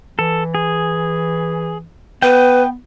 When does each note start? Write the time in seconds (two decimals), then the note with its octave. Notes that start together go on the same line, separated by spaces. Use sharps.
0.19 E3 A4
0.55 G#4
2.22 B3 B4 G5